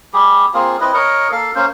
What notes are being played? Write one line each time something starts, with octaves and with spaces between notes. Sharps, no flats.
G3 G4 G#4
A#3 C4 F4 G#4
C4 E4 B4 D#5
A#4 C#5 D#5
A#3 A4 F5
A#3 C#4 C5